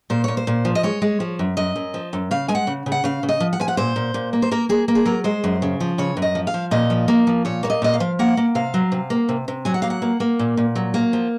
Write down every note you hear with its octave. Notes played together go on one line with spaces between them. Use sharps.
A#2 C5
A#2 C#5
C5
A#2
F3
D#5
G#3 C#5
G#3
F3
F#2
F#2 D#5
F#2
F3
F#2
C#3 F5
G#3 G#5
F#5
C#3
C#3
F#5
C#3 F5
C#3
D#5
F3
F#5
F3 G#5
F#5
A#2 C5
A#2
A#2
A#3
C5
A#3 A#4
A#3 G#4
A#3
G#4
F#3 A#4
G#3 C5
F#2
C#3
F3
C#3 C#5
F#2
D#5
F3
F5
F3
A#2 D#5
F3
A#3
F3
A#2 C#5
A#3 C#5
D#5
A#2 D#5
F5
F3
A#3 F#5
A#3
C3 F5
F#3
C3
A#3
C3
C3
F#3 G#5
F#5
A#3 F5
F#5
A#3
A#3
A#2
A#2
F#3
A#3
F3